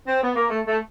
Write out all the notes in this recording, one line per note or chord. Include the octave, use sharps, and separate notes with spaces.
C4
B3
A#3
A3
A3